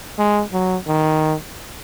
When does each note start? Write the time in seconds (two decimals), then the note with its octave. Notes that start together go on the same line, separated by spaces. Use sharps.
0.19 G#3
0.53 F#3
0.87 D#3